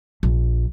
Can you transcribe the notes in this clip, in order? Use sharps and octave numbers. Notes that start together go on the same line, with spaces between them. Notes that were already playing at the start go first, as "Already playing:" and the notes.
A#1